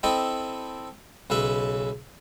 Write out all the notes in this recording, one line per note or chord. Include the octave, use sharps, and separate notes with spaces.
C4 E4 A4 D#5 G5 B5
B1 C#3 B4 E5 B5